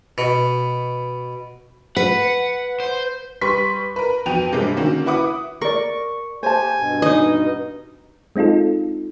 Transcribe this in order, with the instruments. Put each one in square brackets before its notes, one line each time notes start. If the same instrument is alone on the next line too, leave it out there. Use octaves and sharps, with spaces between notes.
[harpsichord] B2
[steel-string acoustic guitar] B4 [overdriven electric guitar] F#5
[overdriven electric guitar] C5
[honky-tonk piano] G3 B4 C6 C#6 B6
A#4 B4
F2 B3 F#4 G5 D#7 F7
G2 C3 G3 G#3 A#3
D3 D#3 A#3 C#4 F#4
E4 B4 F#5 D6 D#6
[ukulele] A#4 D5 [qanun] C#6
[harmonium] G4 [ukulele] C5 A5 [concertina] G#5
[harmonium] G2 B2
[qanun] D#4 D#5
[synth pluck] G#3 C4 D#4 F4 A4